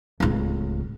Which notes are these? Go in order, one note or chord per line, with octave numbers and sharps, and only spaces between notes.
D1 C#2